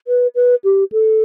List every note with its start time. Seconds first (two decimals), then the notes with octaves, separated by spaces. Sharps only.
0.07 B4
0.35 B4
0.64 G4
0.92 A4